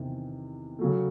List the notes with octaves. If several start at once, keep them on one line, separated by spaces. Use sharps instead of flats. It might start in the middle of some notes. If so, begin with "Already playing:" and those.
Already playing: E2 C3 D#3
C#3 F#3 A3